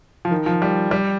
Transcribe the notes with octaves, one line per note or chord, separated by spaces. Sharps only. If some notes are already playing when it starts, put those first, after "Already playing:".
F3
D#3
F3
G3
G3